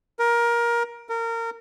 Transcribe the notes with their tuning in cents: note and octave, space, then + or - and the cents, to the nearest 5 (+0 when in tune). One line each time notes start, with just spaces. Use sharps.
A#4 +20
A#4 -25